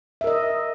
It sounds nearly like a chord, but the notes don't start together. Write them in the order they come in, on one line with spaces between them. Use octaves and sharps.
E5 A#4 D#5